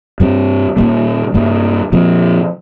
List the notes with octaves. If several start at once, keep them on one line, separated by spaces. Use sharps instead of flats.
G2 G3 C4
A#2 G3 A#3
G2 G3 A#3
A#2 F3 C4